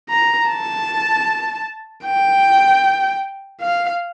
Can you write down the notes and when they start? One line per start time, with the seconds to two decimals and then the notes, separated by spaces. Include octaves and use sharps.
0.09 A#5
0.49 A5
2.05 G5
3.62 F5